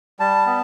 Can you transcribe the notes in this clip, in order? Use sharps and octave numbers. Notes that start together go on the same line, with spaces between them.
G3 A5
B3